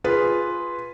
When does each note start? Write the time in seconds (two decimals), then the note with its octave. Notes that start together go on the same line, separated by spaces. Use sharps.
0.04 F4 G#4 B4